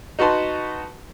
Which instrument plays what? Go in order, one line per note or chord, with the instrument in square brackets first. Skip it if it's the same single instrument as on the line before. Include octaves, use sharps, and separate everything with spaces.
[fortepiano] D#4 F#4 B4 A5 C6